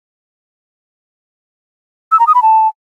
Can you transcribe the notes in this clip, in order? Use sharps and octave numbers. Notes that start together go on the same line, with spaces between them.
E6
A#5
D#6
B5
A5